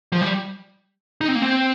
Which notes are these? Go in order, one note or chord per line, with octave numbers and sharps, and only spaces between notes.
F3
G3
D#4
C4
A#3
C4